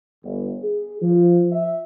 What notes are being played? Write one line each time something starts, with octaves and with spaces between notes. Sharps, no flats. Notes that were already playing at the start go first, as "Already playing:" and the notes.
G1
G#4
F3
E5